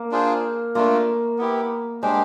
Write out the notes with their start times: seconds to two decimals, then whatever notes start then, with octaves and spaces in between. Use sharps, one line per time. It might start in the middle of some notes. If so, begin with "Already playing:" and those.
Already playing: A#3
0.11 D4 F4 G#4 C5
0.75 A3 A#3 D4 F4
1.38 B3 E4 G4
2.02 G#3 D4 G4 C5